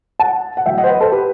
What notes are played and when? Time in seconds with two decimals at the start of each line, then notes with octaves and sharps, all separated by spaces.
0.19 F#5 A5
0.57 F#5
0.66 B1 A2 E3 E5 G5
0.78 D#5 F#5
0.84 C5
0.89 B4 D#5
1.01 A4 C5
1.12 G4 B4